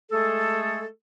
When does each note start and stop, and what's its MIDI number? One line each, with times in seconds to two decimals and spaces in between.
0.10 0.84 56
0.10 0.84 57
0.10 0.84 68
0.10 0.84 69